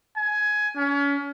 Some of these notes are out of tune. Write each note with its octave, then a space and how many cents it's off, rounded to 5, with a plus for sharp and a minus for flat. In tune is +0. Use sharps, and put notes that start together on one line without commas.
G#5 +15
C#4 +35